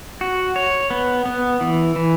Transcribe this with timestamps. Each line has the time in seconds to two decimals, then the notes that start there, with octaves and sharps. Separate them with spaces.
0.21 F#4
0.56 C#5
0.90 B3
1.25 B3
1.61 E3
1.96 E3